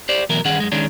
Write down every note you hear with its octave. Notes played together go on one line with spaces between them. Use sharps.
G4 C5 D5
D2 B2 E3 F#3 A#4
G2 D#3 C#4 G#4 F#5
F#2 G#3
D#3 G#3 C#4 D4